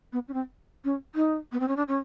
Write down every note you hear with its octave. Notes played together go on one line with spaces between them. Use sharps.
B3
C#4
C4
C#4
D#4
B3
C4
C#4
D4
C#4